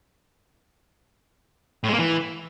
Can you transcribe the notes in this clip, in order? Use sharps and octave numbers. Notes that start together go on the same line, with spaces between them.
A2
G#3
A#3
E3